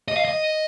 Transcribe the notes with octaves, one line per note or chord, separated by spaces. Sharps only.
D#5
F5
D#5